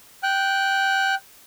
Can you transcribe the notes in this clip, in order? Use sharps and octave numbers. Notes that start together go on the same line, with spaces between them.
G5 F#6